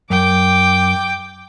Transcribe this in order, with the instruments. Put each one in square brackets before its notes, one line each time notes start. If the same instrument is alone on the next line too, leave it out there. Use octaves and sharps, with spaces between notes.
[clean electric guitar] F#2 [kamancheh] G5 D6